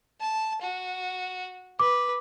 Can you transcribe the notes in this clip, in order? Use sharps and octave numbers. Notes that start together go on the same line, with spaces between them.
A5
F#4
B4 D6